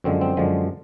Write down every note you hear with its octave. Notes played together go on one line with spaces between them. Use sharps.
F#2 D3 F3 G#3 C4
C4
F#2 D3 F3 G#3